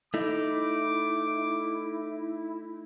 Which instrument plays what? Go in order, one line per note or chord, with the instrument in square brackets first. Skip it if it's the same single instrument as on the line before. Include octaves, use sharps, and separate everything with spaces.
[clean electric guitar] A3 D#4 [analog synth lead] E4 [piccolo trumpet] D6